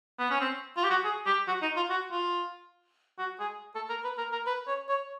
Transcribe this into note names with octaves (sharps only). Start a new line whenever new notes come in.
B3
C#4
C4
F4
G4
F#4
G#4
G4
F#4
D#4
F4
F#4
F4
F#4
G#4
A4
A#4
B4
A#4
A#4
B4
C#5
C#5